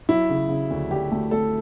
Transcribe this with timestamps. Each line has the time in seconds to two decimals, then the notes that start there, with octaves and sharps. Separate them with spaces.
0.09 F#3 E4
0.30 C#3
0.49 C#3
0.70 D2
0.90 D2 G4
1.12 A3
1.31 A3 A4